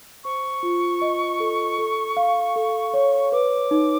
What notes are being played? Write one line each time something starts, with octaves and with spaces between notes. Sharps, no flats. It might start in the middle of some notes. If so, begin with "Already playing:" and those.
C5 C#6
F4
D#5
A4
A4
F5
A4
C#5
B4 D6
D#4